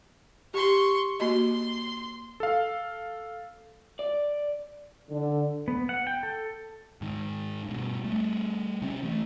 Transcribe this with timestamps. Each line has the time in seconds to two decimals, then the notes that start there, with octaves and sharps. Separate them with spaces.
0.54 G4 C6 C#6
1.20 A#3 F#4 D#5 C6
2.40 A4 F5
3.99 D5
5.10 D3
5.68 B3
5.89 F#5
6.07 G5
6.23 A4
7.01 G#2 D#3
7.65 G2 B2
8.04 G3 A3
8.82 C3 C4 C#4
9.03 E3 A3